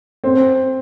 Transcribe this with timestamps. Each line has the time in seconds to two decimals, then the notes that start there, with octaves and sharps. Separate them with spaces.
0.24 C4